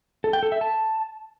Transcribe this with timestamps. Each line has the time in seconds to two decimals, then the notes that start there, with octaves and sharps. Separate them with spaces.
0.24 A4
0.33 G5
0.43 A4
0.52 E5
0.61 A5